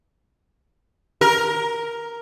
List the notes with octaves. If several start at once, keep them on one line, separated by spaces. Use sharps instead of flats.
A#4